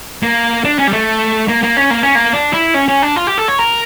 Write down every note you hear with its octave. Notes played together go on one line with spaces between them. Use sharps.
A#3
D4
C#4
G3
A3
A#3
A#3
C#4
A#3
C#4
A#3
D4
E4
C#4
C#4
D4
F4
G4
A4
C#5
A#4